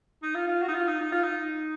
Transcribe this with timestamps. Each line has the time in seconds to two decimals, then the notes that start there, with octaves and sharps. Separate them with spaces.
0.23 D#4
0.35 F4
0.48 F4
0.62 F#4
0.68 D#4
0.74 F4
0.88 D#4
1.01 D#4
1.12 F4
1.23 D#4